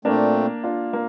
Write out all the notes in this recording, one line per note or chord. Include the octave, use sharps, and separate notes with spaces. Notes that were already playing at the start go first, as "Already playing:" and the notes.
A#2 A3 A#3 C4 D4
D4 F4
A#3